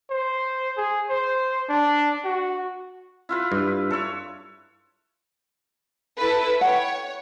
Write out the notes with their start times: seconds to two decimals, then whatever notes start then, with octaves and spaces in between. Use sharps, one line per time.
0.10 C5
0.77 G#4
1.09 C5
1.69 D4
2.25 F#4
3.29 E4 F4 B4
3.52 G2
3.91 A4 C#5
6.18 E4 A4 B4
6.61 C#5 F#5 G5